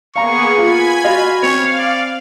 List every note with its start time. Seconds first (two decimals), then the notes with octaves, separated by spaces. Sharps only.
0.16 A#3 B3 G#4 F5 A#5 C#6
0.58 F4 G#5 B5 G#6
1.04 F4 F#4 D#5 F5
1.43 C4 C#5 F5
1.79 D5